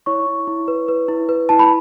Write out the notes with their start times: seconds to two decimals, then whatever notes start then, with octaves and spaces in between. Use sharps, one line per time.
0.06 E4 C#5 C#6
0.27 E4
0.47 E4
0.68 B4
0.88 B4
1.09 E4
1.29 B4
1.49 E4 A5
1.59 B5